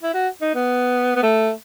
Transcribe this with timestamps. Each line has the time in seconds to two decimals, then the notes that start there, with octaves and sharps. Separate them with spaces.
0.03 E4
0.14 F#4
0.42 D#4
0.55 B3
1.16 B3
1.23 A3